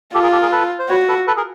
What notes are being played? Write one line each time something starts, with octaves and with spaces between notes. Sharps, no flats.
F4 G4 A4
G#4 A#4
G4 A4
G#4 A#4
A4 B4
C5
F#4 B4 C#5
A4 B4
A4 B4
G#4 A#4